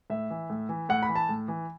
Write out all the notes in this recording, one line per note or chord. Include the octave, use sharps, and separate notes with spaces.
A2 E5
E3
A2
E3
A2 F#5
B5
E3
A5
A2
E3